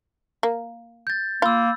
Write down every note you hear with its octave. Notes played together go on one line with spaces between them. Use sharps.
A#3
G6 A6
A#3 F4 B5 E6